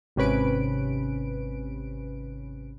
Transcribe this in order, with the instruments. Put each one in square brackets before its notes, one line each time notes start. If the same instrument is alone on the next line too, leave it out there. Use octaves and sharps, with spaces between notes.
[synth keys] G#1 C3 C#4 B4 D7